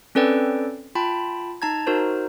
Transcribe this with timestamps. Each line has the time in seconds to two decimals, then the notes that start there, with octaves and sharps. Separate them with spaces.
0.15 C4 C#4 A4 B4 D5 G5
0.95 F4 G5 A5 B5
1.62 D#4 A5 A#5 G#6
1.87 D#4 F#4 A#4 C5